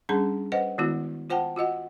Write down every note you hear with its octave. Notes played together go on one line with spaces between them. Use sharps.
G3 C#4 D4 G#4 A5 A#5
B4 C5 D#5 F#5
D#3 G#3 B3 E4 F#4
F4 C5 F#5 G5 A5
F4 F#4 D#5 F#5